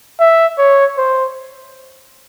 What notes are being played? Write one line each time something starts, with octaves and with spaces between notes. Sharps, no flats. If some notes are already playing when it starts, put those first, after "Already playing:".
E5
C#5
C5